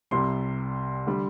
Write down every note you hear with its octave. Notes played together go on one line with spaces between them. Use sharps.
C2 C3 G3 C6
D3 G3